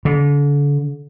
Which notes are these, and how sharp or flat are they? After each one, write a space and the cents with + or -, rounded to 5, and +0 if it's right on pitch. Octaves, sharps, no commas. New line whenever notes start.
D3 -35